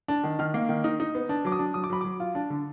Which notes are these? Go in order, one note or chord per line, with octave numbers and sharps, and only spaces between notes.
D4
D#3
D#3 F6
A#3
D#3
D#4
D#4
B3
D4
F#3 D6
D#6
D4
F#3 D#6
D6
F#3 B5
F#3 D6
F4
D4
D3